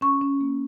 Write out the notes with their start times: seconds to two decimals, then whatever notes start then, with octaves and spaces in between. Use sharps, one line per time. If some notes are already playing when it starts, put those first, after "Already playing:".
0.01 C#4 C#6
0.21 C#4
0.41 A#3